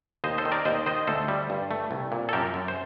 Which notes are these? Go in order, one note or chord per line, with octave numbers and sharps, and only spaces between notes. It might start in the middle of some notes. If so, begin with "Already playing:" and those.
D#2 C5 D#5
A4 C5
D#3
A#4 D5
D#2 C5 D#5
D#3 C5 D#5
D2 A4 C5
G3
G2
A3
C2
A#2
A4
F#2 G4 A#4
F#2
C5